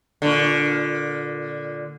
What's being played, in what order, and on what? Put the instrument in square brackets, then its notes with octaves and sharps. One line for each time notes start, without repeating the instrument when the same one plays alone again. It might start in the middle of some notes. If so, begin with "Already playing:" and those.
[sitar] A#2 D3